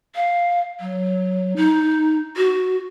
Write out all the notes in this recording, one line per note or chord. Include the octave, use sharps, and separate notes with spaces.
F5
F#3
D#4
F#4